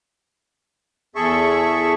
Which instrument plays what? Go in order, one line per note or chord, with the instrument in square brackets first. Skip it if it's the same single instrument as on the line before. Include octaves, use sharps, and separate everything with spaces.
[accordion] E2 G#4 A4 E5 C#6